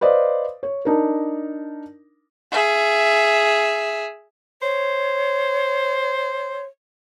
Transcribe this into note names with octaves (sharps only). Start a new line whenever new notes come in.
B4 C5 D5 D#5 F5
C#5
D4 D#4 A#4
G#4 E5
C5 C#5